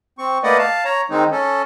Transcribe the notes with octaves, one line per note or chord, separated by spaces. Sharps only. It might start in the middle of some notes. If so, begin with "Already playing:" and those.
C4 C#6
A3 A#3 B4 D5 D#5 F#5
F5 A5
C#5 A#5
D#3 G#3 C4 D#4
C#4 A4